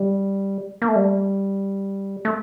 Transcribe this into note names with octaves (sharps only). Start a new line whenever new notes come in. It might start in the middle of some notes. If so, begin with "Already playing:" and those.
Already playing: G3
A#3
A3
G3
A3